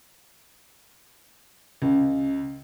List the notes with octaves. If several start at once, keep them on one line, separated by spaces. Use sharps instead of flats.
C#2